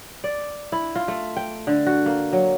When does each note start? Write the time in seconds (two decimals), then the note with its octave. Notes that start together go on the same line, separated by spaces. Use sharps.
0.24 D5
0.72 E4
0.95 F4
1.08 A3
1.36 G5
1.67 D3
1.86 F#4
2.06 A#3
2.33 F#3